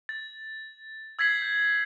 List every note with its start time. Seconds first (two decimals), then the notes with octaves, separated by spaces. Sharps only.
0.09 A6
1.19 E6 G#6 A6 B6 C7 F#7
1.42 G6